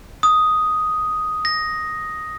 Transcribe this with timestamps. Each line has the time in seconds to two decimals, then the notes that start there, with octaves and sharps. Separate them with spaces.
0.23 D#6
1.45 A#6